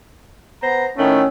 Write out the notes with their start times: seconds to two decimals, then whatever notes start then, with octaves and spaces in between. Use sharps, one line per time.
0.63 B3 C5 A#5
0.98 A2 D#3 A3 C#4